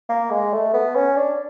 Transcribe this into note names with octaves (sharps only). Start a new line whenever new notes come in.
A#3
G#3
A3
B3
C#4
D4